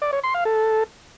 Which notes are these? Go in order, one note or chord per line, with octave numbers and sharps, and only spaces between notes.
D5
C#5
C6
F5
A4